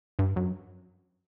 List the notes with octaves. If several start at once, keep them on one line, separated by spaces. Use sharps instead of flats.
G2
F#2